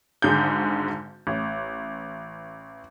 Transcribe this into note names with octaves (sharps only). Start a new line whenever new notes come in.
G#1 G#2 D3 G#4 G6
A1